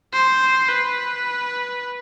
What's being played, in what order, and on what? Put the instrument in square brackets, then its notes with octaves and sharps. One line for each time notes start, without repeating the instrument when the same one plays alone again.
[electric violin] C5
B4